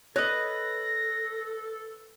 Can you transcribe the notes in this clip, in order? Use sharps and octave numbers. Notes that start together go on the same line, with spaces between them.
A4 B4 C#5 D#5 A#6